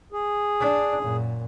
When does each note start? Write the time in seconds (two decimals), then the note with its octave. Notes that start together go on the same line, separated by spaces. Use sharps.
0.12 G#4
0.60 D4
1.00 F#2 A#2